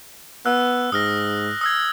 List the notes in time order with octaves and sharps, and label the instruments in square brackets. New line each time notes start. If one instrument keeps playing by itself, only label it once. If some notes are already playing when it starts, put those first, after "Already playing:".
[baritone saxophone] B3 [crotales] E6 F#6
[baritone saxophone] G#2 [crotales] D#6 F6 A#6
[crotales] D#6 E6 G#6